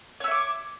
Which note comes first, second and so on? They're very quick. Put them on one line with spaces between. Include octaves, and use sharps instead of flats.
C#5 E6 E5 D6